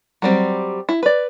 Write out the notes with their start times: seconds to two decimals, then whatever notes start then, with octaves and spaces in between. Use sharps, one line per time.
0.22 F#3 G3 C4
0.89 E4
1.03 B4 D5